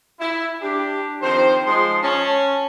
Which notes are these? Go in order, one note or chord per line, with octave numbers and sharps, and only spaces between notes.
E4
D4 G4
D#3 F3 C4 C5
F3 G#3 C6
C#4 C#5 A5